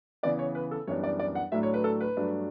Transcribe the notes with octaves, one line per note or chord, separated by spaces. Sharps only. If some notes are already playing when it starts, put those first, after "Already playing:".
C#3 E3 B3 D5
C#5
B4
A4
F#2 E3 G3 B3 D4 C#5
D5
D5
F#5
A2 F#3 A3 D4 E5
C#5
B4
A4
B4
G2 F#3 A3 D4